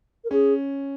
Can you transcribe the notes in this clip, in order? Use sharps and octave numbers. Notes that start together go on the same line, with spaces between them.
A#4
C#4 G#4